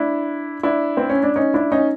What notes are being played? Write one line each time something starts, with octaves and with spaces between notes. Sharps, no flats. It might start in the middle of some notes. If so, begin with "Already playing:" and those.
Already playing: D4 E4
D4 E4
C4
C#4
D4
C#4 D#4
D4 E4
C#4 D#4